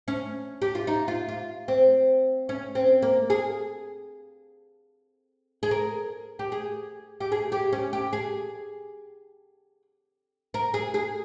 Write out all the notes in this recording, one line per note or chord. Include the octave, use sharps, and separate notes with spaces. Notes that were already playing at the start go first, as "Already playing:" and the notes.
C#4
G4
F4
D#4
F4
F4
C4
C#4
C4
A#3
G#4
G#4
A#4
G4
G#4
G4
G#4
G4
C#4
G4
G#4
A#4
G#4
G#4